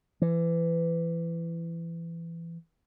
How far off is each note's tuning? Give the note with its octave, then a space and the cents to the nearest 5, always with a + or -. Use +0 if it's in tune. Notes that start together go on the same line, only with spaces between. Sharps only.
E3 +25